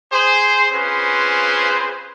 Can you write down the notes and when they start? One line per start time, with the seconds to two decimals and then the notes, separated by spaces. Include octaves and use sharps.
0.12 G#4 C5
0.73 C4 C#4 F4 G#4 B4 C5